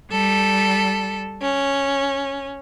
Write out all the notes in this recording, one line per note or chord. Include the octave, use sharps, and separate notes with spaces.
G3 A4
C#4